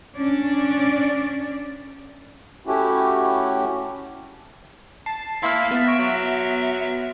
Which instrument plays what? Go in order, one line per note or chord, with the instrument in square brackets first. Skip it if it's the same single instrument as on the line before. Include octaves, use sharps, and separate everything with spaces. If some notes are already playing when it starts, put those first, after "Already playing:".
[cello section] C#4 D4 D5
[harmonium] A3 C#4 E4 F#4 G4
[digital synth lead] A5 [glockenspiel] C7
[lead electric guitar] A#3 F5 [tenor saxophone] E4 [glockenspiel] C6 F6
[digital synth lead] B3 [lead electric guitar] E5 [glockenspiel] A6 B6
[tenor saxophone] C#5 [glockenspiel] A#6 D7
[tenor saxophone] F#3